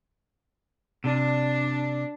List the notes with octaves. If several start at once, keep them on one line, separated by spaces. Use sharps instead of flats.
C3 D4